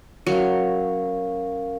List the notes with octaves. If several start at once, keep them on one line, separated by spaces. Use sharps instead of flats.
F#3 C#4 A#4 F5